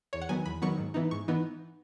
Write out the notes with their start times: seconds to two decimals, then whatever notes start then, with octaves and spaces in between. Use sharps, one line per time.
0.13 E2 C#5
0.22 F#5
0.29 D#3 F#3 B3 G#5
0.46 E2 B5
0.62 D#3 F#3 B3 C#6
0.78 G#2
0.94 E3 B3 D#4
1.11 G#2 C#6
1.28 E3 B3 D#4